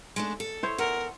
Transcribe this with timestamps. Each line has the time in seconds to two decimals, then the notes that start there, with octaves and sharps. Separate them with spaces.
0.16 G#3 A3 D4
0.40 A4
0.63 E4 C5 C#5
0.78 E2 A#4 F#5